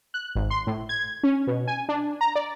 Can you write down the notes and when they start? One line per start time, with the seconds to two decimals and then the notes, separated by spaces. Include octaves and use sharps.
0.14 F#6
0.35 G#1
0.50 C6
0.67 A2
0.89 G#6
1.23 C#4
1.47 B2
1.68 G#5
1.89 D4
2.21 A#5
2.36 D5